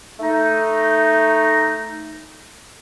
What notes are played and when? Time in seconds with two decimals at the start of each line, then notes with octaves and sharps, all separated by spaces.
0.20 A3 D#4